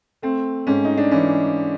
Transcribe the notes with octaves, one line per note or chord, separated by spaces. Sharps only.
A3 C4
G#2 C#4
D#4
D4
E3 C#4